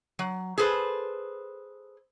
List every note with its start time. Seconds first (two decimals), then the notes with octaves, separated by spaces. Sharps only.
0.19 F#3
0.58 G#4 A4 B4 C5